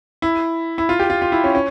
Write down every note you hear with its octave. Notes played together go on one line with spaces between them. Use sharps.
E4
E4
F4
G4
F4
F4
E4
C#4
C#4